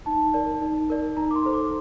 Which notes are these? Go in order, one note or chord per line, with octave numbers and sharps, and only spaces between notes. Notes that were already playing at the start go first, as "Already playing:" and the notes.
D#4 A5
A#4 D5
D#4
A#4 D5
D#4 A#5
D6
C6
A4 C5
D6